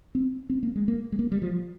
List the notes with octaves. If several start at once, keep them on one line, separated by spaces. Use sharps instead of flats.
C4
C4
A#3
G#3
A#3
G#3
A#3
G3
F3